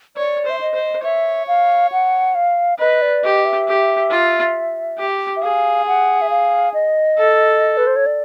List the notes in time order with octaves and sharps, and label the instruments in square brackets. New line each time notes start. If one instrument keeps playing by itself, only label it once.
[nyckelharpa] C#5 [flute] D5
[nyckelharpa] C5 [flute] E5
[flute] D#5
[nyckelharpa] C5
[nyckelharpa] C#5 [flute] E5
[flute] F5
F#5
F5
[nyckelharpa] B4 [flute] D#5
[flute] D5
[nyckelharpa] G4 [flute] D#5
[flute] E5
[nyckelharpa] G4
F4
G4
[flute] E5
[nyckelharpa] G#4 [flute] F5
[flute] F#5
E5
F5
D#5
[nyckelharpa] A4
[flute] B4
C5
C#5
D5